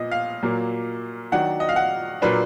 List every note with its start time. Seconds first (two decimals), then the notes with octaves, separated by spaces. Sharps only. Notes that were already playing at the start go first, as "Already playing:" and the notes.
Already playing: A#2 F3 B3 D#5
0.12 F5
0.42 A#2 F#3 A#3
1.32 D#3 F#3 D4 F#5
1.60 D#5
1.69 F5
1.76 F#5
2.22 A#2 F#3 A#3 D4 B4